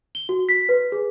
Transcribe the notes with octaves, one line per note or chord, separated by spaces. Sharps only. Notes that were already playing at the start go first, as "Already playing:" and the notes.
G7
F#4
B6
B4
G#4